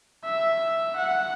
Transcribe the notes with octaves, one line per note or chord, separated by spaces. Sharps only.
E5
F#5